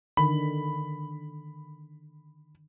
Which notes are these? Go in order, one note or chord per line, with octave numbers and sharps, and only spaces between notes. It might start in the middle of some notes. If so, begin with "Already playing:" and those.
D3 D#3 B5